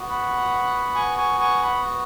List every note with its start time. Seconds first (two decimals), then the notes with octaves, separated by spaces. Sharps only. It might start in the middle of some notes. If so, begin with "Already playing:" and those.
Already playing: B3 F#4
0.09 F#5 B5
0.95 G#5 C#6
1.18 G#5 C#6
1.40 G#5 C#6
1.63 F#5 B5